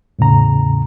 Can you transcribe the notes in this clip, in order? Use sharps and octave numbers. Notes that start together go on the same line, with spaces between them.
E2 A2 C#3 A#5